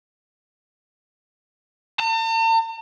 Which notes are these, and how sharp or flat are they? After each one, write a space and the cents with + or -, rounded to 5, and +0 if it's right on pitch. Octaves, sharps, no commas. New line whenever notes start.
A5 +45